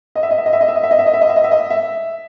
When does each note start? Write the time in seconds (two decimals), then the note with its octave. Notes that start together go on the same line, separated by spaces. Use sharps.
0.15 D#5
0.23 E5
0.31 D#5
0.38 E5
0.46 D#5
0.53 E5
0.61 D#5
0.68 E5
0.75 D#5
0.83 E5
0.91 D#5
0.99 E5
1.06 D#5
1.13 E5
1.21 D#5
1.29 E5
1.36 D#5
1.44 E5
1.51 D#5
1.70 E5